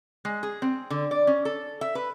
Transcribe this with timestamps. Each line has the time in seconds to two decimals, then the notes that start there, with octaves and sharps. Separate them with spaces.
0.25 G#3
0.43 G#4
0.62 C4
0.90 D3
1.11 D5
1.27 C#4
1.45 A4
1.81 E5
1.95 B4